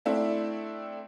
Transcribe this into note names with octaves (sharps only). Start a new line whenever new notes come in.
A3 C4 D4 E4 E5